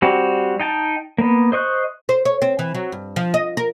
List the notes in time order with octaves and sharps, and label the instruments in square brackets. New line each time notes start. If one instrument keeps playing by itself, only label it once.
[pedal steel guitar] G3 C4 F#4
D#4 G5 A5
A#3 B3
C5 D#5 C#6 F#6
[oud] C5
C#5
C4
E3
F#3
G2
F3
D#5
A#4